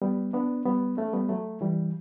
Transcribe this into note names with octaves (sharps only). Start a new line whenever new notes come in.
G3 B3
B3 D4
G3 B3
A3 C#4
G3 B3
F#3 A3
E3 G3